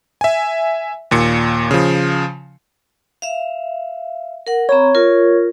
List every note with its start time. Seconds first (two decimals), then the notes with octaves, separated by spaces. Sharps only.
0.21 E5 G#5
1.11 D#2 A#2 C#7
1.71 C#3 F3
3.22 E5 F5
4.47 A#4 F#5
4.69 C4 C#5 A#5 B5
4.95 F4 A#4